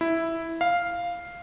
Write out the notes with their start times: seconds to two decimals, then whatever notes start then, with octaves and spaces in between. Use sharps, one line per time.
0.01 E4
0.61 F5